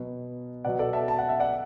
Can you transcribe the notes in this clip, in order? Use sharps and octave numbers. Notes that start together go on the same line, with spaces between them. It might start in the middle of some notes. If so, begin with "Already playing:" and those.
Already playing: B2 F#3
B2 F#3 D5 F#5
A4 D5
E5 A5
A5
F#5
E5
D5 F#5